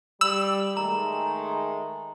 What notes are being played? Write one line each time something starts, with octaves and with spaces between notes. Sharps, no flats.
G3 B5 E6 F#7
D#3 G#3 A3 A#5